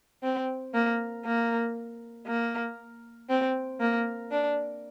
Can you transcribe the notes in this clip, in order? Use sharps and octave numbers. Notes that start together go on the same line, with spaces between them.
C4
A#3
A#3
A#3
C4
A#3
D4